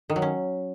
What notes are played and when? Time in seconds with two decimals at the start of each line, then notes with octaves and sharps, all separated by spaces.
0.10 D#3
0.16 F#3
0.22 C#4